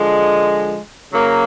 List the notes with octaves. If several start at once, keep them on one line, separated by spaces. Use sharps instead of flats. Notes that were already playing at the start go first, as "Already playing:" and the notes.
Already playing: D3 F3 G#3
C#3 F#3 A#3